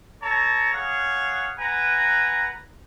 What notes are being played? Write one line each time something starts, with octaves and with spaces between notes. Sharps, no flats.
A4 C#5 A5 A#5
G#4 C#5 F5 F#5
B4 F#5 G#5 A#5